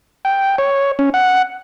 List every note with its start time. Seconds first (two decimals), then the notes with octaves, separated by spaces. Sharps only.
0.25 G5
0.58 C#5
0.99 C#4
1.14 F#5